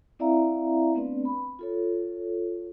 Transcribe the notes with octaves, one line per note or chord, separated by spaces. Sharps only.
C4 E4 D5 E5 F5 A#5
A3 B3 C4 D4 B4 D5
B5
F4 A4 C#5